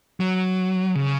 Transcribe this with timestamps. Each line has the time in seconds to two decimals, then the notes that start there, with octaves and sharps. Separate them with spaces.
0.20 F#3
0.95 C#3